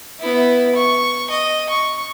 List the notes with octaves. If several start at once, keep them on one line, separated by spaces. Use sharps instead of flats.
B3 E4
C#6
D#5
C#6